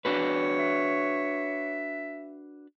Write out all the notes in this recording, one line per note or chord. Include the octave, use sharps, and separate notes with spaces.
D4 F#4 B4 C#5
E5